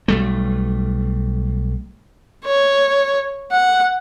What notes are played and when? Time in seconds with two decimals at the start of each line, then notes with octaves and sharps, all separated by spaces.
0.08 B1 G3 A3
2.45 C#5
3.52 F#5